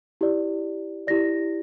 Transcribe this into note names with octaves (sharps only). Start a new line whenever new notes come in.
E4 G4 D5
E4 G4 D5 A#6